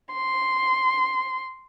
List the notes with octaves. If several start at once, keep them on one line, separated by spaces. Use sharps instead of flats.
C6